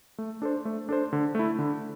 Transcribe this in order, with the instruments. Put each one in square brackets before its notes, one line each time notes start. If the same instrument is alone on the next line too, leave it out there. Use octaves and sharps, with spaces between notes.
[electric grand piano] A3
D4 A4 C5
A3
D4 A4 C5
D3
A3 E4
D3